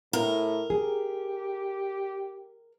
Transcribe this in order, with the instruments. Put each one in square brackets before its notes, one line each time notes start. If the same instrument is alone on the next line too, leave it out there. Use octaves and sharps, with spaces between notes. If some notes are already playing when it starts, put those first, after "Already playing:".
[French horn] A2 [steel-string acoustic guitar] A#4
[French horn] G4 [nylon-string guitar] G#4